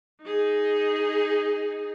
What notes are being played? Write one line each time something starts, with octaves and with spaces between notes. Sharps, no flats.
D#4 G#4